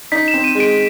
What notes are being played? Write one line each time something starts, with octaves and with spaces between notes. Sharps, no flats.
D#4 B6
E7
C4
D#7
G#3
D7